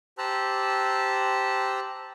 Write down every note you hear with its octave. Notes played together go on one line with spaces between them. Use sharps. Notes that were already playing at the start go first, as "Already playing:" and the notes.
G4 C5 A5 A#5 E6 F#6